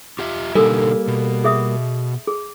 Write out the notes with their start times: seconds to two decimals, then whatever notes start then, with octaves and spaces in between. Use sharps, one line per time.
0.19 F4 G4 E5
0.56 B2 D3 G3 A#3 D#4 A4 G#5 E6
1.08 B2
1.44 G#4 E5 D#6
2.27 G#4